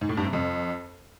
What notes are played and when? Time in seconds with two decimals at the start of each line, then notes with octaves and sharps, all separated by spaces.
0.01 G#2
0.09 A2
0.17 G2
0.25 C3
0.33 F2